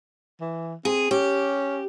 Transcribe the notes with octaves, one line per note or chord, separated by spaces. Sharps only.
E3
C4 G#4
C#4 G4